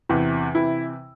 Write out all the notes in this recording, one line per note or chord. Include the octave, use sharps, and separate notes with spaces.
E2 C3 E3
C3 E3 E4